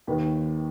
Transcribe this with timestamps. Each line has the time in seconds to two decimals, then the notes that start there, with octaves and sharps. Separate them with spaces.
0.07 D#2 D#3 B4